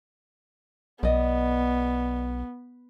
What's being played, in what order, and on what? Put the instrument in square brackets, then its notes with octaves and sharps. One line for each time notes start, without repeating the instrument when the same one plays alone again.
[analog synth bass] B1 [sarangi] B3 [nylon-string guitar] D5 D#5